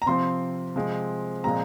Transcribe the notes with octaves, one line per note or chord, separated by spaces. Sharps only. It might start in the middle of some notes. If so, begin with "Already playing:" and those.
A#5
C3 F3 C4 C6
C3 F3 G#3 C4
A#2 F3 G#3 C4 A#5